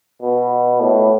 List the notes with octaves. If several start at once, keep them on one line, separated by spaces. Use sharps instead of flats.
B2
A2